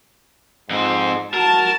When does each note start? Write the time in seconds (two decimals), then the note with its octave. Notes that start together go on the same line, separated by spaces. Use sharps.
0.70 F2 G#2 C4
1.34 F#4 A#4 A5